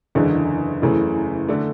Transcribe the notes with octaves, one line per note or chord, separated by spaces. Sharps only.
F#1 E2 D3 G#3 D4
F#1 E2 C#3 E3 A3
D3 A3 D4